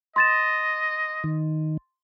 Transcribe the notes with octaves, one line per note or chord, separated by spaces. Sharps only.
D#5 C6 A6 E7
D#3